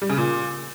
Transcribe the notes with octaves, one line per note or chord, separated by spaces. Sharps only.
G3
C#3
A#2